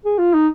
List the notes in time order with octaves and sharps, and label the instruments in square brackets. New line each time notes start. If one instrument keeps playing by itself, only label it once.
[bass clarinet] G#4
F4
D#4